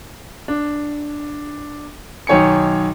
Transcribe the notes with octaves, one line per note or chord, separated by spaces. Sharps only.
D4
B1 D#3 C#5 G#5 C#7